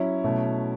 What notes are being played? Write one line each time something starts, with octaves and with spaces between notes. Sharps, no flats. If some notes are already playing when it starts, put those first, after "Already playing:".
Already playing: F#3 C#4 E4
B2 F#3 A3